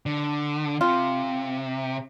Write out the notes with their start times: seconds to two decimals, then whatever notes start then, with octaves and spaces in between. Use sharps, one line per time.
0.06 D3
0.81 C3 F4